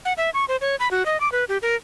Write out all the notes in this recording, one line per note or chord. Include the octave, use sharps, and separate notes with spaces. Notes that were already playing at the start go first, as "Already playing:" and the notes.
F#5
E5
C#6
C5
C#5
B5
F#4
D#5
D6
B4
G4
A#4